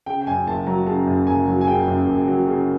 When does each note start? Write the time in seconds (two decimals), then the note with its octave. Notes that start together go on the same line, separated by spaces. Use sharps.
0.06 C#3 G5
0.21 G5
0.27 F#2 G#5
0.47 F#1 A5
0.67 F#3 A#5
0.87 C#3 A5
1.07 F#2
1.27 F#1 G#5
1.47 F#3
1.61 G#5
1.67 C#3 G5
1.88 F#2
2.07 F#1
2.28 F#3
2.47 C#3